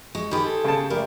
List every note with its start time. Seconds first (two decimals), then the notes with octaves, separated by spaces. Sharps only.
0.15 G#3 C#6
0.31 D#3 G4 G#4 C5 B5
0.46 A4
0.64 C#3 C5 A5
0.90 G3 A3 A#3 A#4